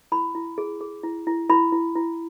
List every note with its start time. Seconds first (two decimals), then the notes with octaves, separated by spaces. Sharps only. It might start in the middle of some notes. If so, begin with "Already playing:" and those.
0.12 E4 B5
0.35 E4
0.58 G#4
0.81 G#4
1.04 E4
1.27 E4
1.49 E4 B5
1.72 E4
1.95 E4